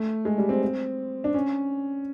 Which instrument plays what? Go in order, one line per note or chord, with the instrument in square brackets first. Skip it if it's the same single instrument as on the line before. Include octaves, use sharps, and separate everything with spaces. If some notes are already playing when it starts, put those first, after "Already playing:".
Already playing: [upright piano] A3
G#3
G3
C4
C4
D4
C#4